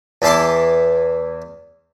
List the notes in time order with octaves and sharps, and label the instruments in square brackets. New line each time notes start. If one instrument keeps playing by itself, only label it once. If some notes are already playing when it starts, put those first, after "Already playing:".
[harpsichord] E2 E3 E4 A5 C6 D6